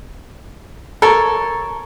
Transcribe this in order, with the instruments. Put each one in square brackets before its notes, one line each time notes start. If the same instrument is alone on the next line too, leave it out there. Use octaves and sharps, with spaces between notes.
[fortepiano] A4 [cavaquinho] A#4 C#5